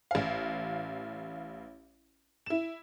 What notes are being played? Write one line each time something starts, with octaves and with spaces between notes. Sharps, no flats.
A1 F5
E4 E7